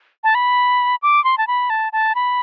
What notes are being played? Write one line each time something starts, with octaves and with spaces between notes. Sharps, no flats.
A5
B5
D6
C6
A5
B5
A5
A5
B5